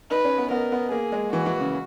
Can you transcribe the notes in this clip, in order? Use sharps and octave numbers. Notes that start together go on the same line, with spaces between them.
D#4 B4
C#4
B3
B3 A#4
B3
A#3 G#4
G#3
E3 F#4
E3
C#3